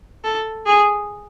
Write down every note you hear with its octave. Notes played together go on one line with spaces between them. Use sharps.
A4
G#4